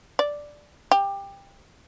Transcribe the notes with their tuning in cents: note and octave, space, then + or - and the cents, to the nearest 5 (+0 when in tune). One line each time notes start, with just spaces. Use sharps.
D5 +0
G4 +20